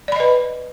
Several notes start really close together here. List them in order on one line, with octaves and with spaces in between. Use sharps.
D5 B5 D#5 B4